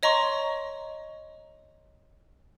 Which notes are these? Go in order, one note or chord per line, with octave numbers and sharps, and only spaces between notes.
C#5 D#5 A#5 C6 C#6